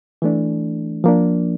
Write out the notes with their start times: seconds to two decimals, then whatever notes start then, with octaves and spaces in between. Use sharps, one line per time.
0.22 E3 A3 D4
1.04 F3 A#3 D4